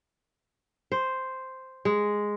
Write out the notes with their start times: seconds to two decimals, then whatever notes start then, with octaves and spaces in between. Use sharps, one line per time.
0.92 C5
1.85 G#3